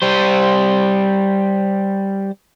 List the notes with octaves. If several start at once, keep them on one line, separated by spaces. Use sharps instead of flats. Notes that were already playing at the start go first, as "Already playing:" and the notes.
G3 C5